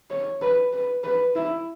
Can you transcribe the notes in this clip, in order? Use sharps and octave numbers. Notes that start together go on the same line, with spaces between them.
C#5
B4
B4
B4
E4